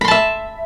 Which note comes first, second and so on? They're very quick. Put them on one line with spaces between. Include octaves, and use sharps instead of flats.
B5 C6 A5 E5